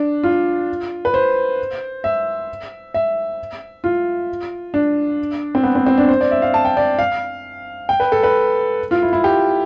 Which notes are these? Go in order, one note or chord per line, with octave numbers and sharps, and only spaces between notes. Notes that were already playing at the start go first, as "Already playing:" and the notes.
Already playing: D4
F4
B4
C5
E5
E5
F4
D4
C4
B3
C4
C4
D4
C5
D5
E5
F5
A5
G5
D5
F5
G5
B4
A4
B4
F4
E4
E4
G4